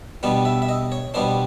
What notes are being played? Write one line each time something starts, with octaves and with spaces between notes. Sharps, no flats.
B2 G3 B3 D4
E5
E5
D#5
C#5
B2 G3 B3 D4 C5